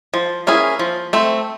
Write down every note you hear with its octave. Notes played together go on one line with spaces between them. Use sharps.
F3
A#3 C#4 E4 G#4
F3
A3 C4